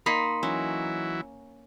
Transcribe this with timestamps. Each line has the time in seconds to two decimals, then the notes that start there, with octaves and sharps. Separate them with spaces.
0.06 A#3 D#4 B5 C6
0.43 E3 F#3 C#4 E4